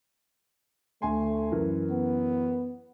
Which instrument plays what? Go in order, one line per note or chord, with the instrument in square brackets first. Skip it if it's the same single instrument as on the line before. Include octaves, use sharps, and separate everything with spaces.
[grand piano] D2 G#5 C6 [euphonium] A3
[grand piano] F#2 E3 A#4
[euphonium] B3